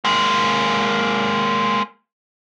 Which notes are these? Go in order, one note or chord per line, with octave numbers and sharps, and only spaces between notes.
G#3 A#3